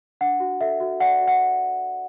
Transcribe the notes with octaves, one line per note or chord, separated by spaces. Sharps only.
D4 F#5
F#4
A4 E5
F#4
D5 F#5
F#4
F#5